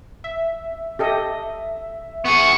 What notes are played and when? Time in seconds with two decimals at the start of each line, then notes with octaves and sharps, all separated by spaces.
0.24 E5
0.99 G4 A4 D#5
2.25 B3 G#4 C#6